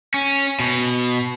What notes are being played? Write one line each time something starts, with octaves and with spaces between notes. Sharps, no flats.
C#4
B2